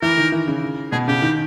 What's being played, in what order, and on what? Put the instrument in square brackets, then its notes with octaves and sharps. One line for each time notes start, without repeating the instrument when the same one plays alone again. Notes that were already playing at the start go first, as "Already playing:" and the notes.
[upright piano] E3 [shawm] A#4
[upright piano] D#3
E3
C#3
[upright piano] B2 [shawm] G#4
[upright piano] C#3 [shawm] G4
[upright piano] D#3